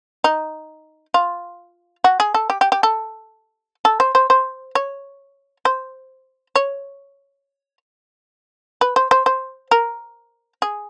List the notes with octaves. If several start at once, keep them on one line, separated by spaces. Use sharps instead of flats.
D#4
F4
F#4
G#4
A4
G4
G4
G4
A4
A4
C5
C5
C5
C#5
C5
C#5
B4
C5
C5
C5
A#4
G#4